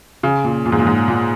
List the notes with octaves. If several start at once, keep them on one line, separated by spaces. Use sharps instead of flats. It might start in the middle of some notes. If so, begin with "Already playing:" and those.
C#3
A#2
A#2
G#2
A#2
G#2
A#2